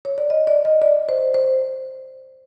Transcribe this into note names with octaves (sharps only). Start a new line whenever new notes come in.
C#5
D5
D#5
D5
D#5
D5
C5
C5